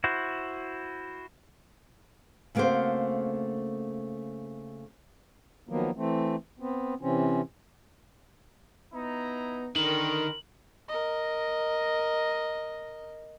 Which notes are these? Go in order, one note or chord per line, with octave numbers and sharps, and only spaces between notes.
E4 F#4 C5
C#3 A3 A#3 C4 F#4 C5
D#3 F3 F#3 A#3 B3
E3 A3 C4
B3 C4
C3 E3 C4 C#4
B3 D#4 E4 A#5
D3 D#3 A#4 B4 C6 F#7
A#4 D#5